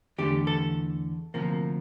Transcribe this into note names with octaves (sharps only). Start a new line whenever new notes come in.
E2 D3 A3 G4
A4
D2 C3 F3 A#3